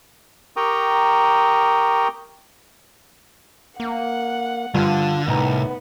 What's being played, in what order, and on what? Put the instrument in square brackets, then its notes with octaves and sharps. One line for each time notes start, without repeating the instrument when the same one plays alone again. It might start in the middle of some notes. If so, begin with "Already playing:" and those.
[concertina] G4 A#4 G5 A#5 C#6 D#6
[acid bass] A#3 [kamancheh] F#5
[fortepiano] G2 F3 [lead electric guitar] D3 [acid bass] F4
[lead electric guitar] C2 [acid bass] A2 [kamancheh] B3 [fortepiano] D#4 A#5